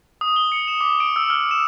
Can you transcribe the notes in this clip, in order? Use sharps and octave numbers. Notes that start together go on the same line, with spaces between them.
D#6
G7
C#7
E7
D6
D7
E6
F6
E7